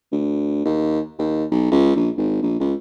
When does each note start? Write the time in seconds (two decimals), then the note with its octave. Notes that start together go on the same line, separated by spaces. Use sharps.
0.12 D2
0.65 D#2
1.18 D#2
1.51 B1
1.71 C#2
1.96 A#1
2.17 G#1
2.42 A#1
2.60 C#2